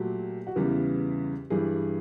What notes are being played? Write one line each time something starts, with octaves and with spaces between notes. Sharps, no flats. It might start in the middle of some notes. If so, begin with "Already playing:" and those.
Already playing: A#2 F#3 A3 G4
F#4
E2 C#3 E3 G3 B3 G4
G2 E3 G3 G#4